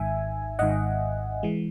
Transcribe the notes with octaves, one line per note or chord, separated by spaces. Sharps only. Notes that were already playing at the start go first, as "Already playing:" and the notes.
Already playing: G#1 G#2 D#3 E5 G#5
G#1 G#2 D#3 D#5 F#5
E3 G#3